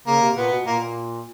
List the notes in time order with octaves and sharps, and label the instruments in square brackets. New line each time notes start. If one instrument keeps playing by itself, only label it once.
[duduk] C#3 [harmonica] A#3
[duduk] C3
[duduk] A#2 [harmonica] B3
[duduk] B2
[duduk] A#2 [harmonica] A#3